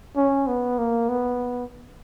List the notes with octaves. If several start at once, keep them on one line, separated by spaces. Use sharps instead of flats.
C#4
B3
A#3
B3